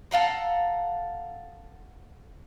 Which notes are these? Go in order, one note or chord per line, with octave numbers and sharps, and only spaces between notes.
A4 F5 F#5 A#5